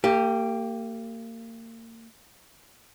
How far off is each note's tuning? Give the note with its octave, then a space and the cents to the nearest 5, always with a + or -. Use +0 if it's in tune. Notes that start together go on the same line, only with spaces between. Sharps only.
A#3 -35 G4 +0